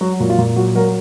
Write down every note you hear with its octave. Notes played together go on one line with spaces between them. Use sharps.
F#3 F#4
A#2
F4
A#2
F#3 F#4
F#3 A#4